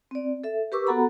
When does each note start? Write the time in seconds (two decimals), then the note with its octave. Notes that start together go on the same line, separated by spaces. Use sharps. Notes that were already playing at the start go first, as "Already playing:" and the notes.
0.11 C4 D5
0.44 A4 E5
0.72 G4 A#4 B4 C#6 D6 E6
0.87 B3 F#4 A4 F#5 A#5 B5